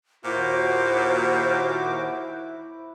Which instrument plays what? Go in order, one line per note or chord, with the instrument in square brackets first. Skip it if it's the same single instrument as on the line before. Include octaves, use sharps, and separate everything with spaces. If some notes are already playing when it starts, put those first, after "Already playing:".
[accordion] D#2 F#4 D6 [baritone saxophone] A#2 [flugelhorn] E4 [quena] C5